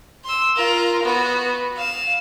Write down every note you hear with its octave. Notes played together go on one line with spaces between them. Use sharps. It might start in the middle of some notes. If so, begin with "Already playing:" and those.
C6 E6
F4 A#4
B3 F#4
F5 E7